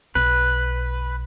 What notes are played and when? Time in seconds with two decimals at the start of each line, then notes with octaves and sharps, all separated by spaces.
0.15 B1 B4